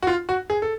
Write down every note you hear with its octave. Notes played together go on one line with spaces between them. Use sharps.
F#4
F4
F#4
G#4
A4